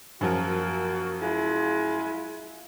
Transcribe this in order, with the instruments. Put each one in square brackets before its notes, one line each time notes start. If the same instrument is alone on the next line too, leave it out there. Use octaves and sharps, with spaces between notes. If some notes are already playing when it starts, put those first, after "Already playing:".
[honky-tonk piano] F#2 F3 F#3 [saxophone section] A#3 F#4
[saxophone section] G#3 E4 F4